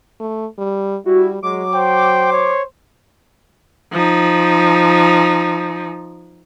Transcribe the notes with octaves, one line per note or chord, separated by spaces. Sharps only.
A3
G3
G3 E4 F#4
F#3 G#3 D6
C5 G5
C#5
F3 D#4